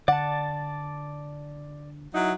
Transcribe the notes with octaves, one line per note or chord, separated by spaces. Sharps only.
D3 D5 F#5 A5
F#3 D#4 E4